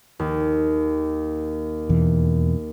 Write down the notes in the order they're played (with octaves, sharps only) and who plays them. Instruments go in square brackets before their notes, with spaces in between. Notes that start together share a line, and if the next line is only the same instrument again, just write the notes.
[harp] D#2
[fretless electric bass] E2 B2 E3